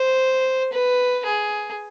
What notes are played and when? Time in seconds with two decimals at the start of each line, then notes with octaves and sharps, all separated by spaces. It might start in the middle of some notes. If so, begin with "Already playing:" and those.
Already playing: C5
0.73 B4
1.25 G#4